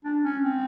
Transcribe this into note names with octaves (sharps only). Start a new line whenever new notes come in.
D4
C#4
C4